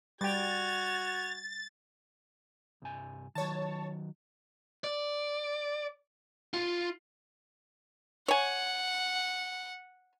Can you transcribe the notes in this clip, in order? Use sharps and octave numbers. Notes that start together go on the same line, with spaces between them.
G3 F#4 G5 G#6 A6 F7
C2 G2 G#5
D#3 F#3 C#5 A5
D5
F4
C#5 F#5 G#5